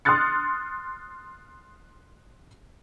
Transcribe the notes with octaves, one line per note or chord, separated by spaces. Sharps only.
C6 D#6 F6 F#6 A6 C#7